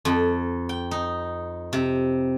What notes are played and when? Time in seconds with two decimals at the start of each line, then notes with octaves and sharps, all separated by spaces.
0.05 F2
0.69 G5
0.91 D#4
1.73 C3